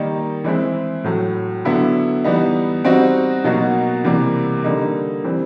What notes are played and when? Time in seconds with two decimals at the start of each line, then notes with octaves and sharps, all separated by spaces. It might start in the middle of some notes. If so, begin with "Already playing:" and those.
Already playing: D#3 G3 A#3 D#4
0.44 E3 G#3 C4 E4
1.04 A2 F#3 A3
1.65 D3 F#3 B3 E4
2.24 E3 G3 B3 D#4
2.85 G3 C4 D#4 F#4
3.44 B2 F#3 A#3 D#4 F#4
4.04 C3 E3 G3 A#3
4.64 D3 G3 A#3 D#4
5.24 E3 G3 C4